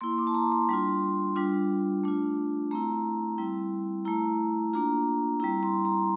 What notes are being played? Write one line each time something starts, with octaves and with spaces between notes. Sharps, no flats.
A#3 E4 C6
D6
A5
A#5
C6
G3 D4 F4 C6
G3 D4 F4
A3 D4 F4
A3 C4 E4 A#5
G3 C4 E4
A3 E4 A#5
A#3 D4 F4 A#5
G3 C4 E4 A#5
C6
A#5